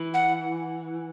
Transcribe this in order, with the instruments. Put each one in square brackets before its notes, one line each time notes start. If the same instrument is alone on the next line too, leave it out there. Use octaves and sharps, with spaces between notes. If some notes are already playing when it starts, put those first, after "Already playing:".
Already playing: [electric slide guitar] E3
[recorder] F#5